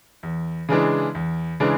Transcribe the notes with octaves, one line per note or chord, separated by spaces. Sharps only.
E2
C#3 E3 G#3 D4
E2
C#3 E3 G#3 D4